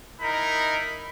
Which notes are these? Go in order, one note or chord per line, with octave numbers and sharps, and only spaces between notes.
D#4 E4 A#4 B5